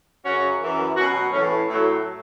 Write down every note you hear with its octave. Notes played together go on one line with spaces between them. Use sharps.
F#2 C#3 F#3 C#4 F#4
F#2 E3
B2 F#3 C#4 F#4
A2 E3 A3 C#4
A2 F#3 A3